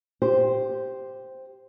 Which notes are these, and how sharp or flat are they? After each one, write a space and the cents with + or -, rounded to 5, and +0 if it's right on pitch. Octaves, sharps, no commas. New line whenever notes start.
G4 +0 C5 +0